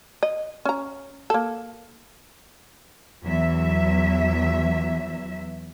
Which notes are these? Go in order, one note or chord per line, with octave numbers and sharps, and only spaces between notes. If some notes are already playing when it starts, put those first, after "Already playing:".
D#5
C#4 A#5
A#3 A4
E2 F#3 E5